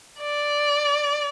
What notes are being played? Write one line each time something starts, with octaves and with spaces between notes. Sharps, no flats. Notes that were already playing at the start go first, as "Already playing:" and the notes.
D5